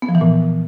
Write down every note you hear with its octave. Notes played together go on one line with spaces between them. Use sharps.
B3
F3
E3
A#2